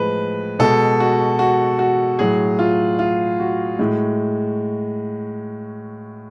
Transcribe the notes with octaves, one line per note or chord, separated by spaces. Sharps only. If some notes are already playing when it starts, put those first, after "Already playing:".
Already playing: A2 F3 G#3 B4
B2 G#3 A4
F#4
F#4
F#4
A2 F#3 G#4
F4
F4
F#4
A2 G#3